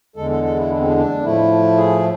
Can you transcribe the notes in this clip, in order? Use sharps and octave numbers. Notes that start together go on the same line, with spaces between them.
E2 D3 G#3 A4
A4
A4
E4
D4
C4
D4
D4
A2 F3 A3 E4
G#4